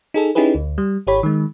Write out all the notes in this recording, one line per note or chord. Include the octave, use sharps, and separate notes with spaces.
D#4 G#4 A4
C#4 D#4 E4 G4 G#4 B4
D2
G3
G#1 G4 C#5 B5
D#3 G#3